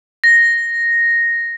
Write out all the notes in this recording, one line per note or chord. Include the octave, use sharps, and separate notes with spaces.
A#6